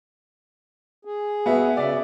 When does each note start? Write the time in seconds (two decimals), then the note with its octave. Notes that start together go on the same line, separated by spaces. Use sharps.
1.05 G#4
1.46 B3 F#4 E5
1.77 C#3 D5 E5